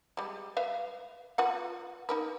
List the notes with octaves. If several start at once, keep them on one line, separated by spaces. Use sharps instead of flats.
G3 G#3
B4 E5 F5
F4 B4 F#5
D#4 A#4 B4